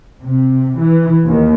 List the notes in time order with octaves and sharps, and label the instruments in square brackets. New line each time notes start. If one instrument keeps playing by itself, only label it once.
[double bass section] C3
E3
D#2